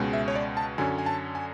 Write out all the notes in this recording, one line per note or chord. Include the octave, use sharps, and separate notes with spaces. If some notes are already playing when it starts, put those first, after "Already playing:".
Already playing: C#2 B2 G#3 C#4
E5
C#5
D5
A5
F#2 D3 F#3 C#4 G#5
G#5
A5
G#5